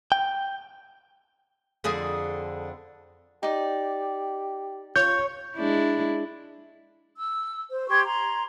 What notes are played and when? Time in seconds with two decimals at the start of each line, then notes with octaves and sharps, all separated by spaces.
0.12 G5
1.84 F2 D3 G#4
3.43 D#4 G4 D5
4.96 F4 C#5 G6
5.56 G#3 D4 E4
7.15 E6
7.70 C5
7.88 G4 C6 C#6 G#6
8.04 A#5 C6